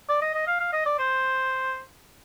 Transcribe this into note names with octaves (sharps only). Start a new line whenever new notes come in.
D5
D#5
D#5
F5
F5
D#5
D5
C5